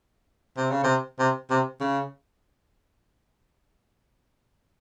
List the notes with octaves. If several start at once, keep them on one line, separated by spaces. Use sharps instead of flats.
C3
C#3
C3
C3
C3
C#3